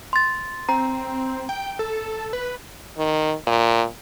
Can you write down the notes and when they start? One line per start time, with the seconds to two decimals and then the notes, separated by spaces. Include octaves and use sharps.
0.13 C6 A6
0.69 C4 A#5
1.49 G5
1.79 A4
2.33 B4
2.98 D#3
3.47 A#2